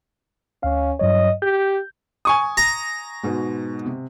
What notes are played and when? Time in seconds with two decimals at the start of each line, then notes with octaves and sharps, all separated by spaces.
0.63 D2 C#4 F5
0.99 G2 F#3 C#5 D#5
1.42 G4 G6
2.25 G#5 C#6 D#6
2.57 A#5
3.23 G#2 B2 G#3
3.86 C3